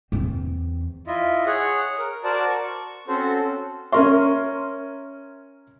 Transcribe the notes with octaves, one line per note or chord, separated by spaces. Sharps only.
E2 C4
E4 F4 D#5
G#4 C#5 F#5
A#4
F#4 A#4 C5 D5 A5
C#6
C4 C#4 F#4 A4 C5
C#4 A#4 C#5 E5 C6 C#6